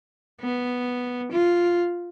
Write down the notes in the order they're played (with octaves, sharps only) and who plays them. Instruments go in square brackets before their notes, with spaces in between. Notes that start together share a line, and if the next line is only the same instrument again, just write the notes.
[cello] B3
F4